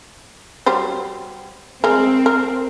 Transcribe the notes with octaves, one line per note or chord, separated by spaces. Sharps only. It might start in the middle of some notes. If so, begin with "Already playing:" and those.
F#3 G3 C5
G#3 C4 A#4
A#4